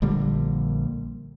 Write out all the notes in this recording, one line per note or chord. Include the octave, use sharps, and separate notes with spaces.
A#1 D3 G3 A#3